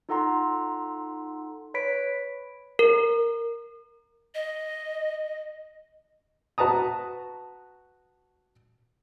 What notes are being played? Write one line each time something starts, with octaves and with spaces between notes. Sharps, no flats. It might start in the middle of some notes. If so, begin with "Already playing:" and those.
D#4 F4 A4 F#5 A#5 C6
B4 C#5 B5 B6 D7
A#4
D#5
F#4 B4 A5 A#5 D#6